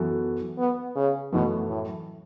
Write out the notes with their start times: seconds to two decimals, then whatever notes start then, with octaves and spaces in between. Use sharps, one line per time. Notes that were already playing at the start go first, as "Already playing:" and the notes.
Already playing: F#2 E3 B3 F#4 A4
0.58 B3
0.96 C#3
1.33 F#2 B2 E3 A3
1.69 A2